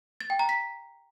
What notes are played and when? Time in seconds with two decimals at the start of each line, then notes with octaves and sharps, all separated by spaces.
0.20 A6
0.30 G5
0.39 A#5
0.49 B6